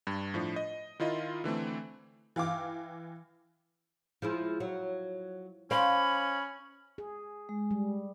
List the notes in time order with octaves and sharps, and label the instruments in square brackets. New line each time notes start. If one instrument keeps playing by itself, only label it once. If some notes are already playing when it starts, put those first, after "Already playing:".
[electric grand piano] G2
A2 F3 D4
D#5
D#3 E4 F4 D#5
D3 E3 A3 C4
[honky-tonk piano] E3 F5 G5 D6
[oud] F3 G#3 E4
F#3
[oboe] C#4 [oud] C5 D5 F5 [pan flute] B5
[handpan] G#4
[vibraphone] G#3
[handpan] G3